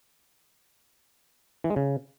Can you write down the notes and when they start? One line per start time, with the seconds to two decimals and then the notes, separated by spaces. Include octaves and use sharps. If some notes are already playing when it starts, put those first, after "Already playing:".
1.64 E3
1.70 G#3
1.76 C#3